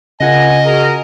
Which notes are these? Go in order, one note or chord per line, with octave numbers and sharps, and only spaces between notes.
C#3 F4 A#4 D#5 F#5 G#5 A#6
F#4 G#4 A#4